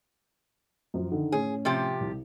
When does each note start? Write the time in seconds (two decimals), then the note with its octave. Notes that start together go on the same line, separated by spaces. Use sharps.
0.94 F#2 F3
1.12 D3 D#3
1.32 A2 C#4 G#4
1.65 C3 F3 G4
2.00 C2